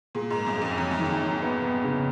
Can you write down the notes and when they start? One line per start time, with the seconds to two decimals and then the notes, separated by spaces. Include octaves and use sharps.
0.15 A#2 G#4
0.30 G#2
0.36 A#3
0.46 F#2
0.57 F2 G#4
0.78 F2 F#3
0.91 F#2
0.99 D#3
1.06 F2
1.20 F#3
1.42 B3
1.62 B3
1.84 C#3